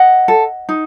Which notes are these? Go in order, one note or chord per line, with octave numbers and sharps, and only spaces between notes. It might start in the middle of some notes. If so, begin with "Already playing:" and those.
Already playing: D#5 F#5
A4
D#4